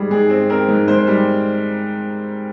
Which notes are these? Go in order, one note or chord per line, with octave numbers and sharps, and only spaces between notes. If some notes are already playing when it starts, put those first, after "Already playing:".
Already playing: G#2 G3 G#4
G#2 G#4
C4
C4 A#4
G#2
G#2 C5
G3